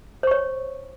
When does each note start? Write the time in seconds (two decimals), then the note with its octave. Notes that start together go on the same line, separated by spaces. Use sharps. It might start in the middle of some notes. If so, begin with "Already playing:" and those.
0.23 C5
0.27 C#6
0.31 C#5